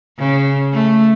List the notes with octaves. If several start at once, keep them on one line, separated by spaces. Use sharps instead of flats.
C#3
A3